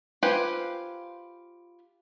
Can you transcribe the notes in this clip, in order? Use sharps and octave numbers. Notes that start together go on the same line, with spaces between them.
F4 G4 B4 C5 G#5